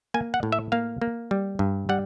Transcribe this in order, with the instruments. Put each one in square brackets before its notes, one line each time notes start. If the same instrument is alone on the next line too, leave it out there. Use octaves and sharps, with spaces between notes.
[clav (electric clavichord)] A#3 G#5
F#5
A2
E5
A#3 F5
A#3
G3
G2
G3 F#5